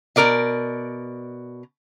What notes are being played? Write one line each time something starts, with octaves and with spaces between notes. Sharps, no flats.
B2 A4 A#4 D5 D#5